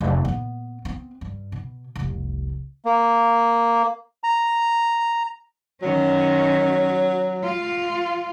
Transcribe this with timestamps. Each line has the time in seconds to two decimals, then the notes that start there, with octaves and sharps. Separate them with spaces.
0.01 F1 C2
0.25 A#2 B3
0.85 B3 C4
1.21 G2
1.52 B2
1.96 F1 C2
2.85 A#3
4.23 A#5
5.82 D#3 F#3 C#4
7.44 F4